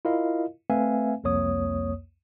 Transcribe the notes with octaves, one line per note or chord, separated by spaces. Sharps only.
E4 F4 A#4 D#5 F5
A3 C4 B4 E5 F5 G#5
C2 F2 A#3 C#5 D#6